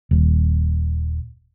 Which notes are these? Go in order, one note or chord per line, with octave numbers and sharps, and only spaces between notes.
D#1